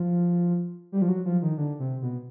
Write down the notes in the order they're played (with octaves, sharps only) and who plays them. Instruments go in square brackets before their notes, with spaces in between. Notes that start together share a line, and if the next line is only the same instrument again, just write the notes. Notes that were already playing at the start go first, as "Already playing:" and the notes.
Already playing: [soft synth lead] F3
G3
F3
F#3
F3
D#3
D3
C3
B2